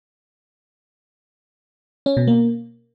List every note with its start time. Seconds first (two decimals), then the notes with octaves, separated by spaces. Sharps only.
2.06 C#4
2.17 B2
2.27 A#3